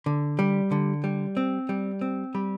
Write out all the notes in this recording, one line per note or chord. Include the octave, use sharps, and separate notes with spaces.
D3
G3
D3
G3
C4
G3
C4
G3